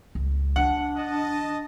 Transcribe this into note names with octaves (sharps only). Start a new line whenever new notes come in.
C#2
D#3 D4 F#5
D#5 A5